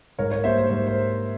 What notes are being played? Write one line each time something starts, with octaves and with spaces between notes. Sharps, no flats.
G#2 A#4 C#5
A#4 C#5
G3 A#3 C5 E5
C5
G#2 C5
C5